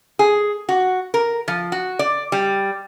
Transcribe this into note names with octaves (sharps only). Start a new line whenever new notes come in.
G#4
F#4
A#4
F3
F#4
D5
G3